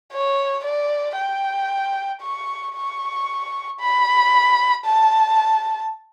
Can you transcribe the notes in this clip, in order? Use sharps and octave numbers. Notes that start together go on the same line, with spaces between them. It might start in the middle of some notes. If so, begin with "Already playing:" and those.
C#5
D5
G5
C#6
C#6
B5
A5